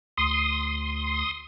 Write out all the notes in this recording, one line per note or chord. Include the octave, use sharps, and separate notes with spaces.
D2 C6 D#6